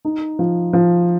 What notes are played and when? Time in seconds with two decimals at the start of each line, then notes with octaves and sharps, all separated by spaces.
0.05 D#4
0.39 F3
0.73 F3